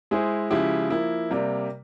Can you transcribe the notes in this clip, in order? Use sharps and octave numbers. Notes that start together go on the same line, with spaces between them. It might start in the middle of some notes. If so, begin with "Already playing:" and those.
G#3 E4 G#4 C5
C#3 F3 G#3 E4 G4
F3 A#3 E4
C3 G3 A#3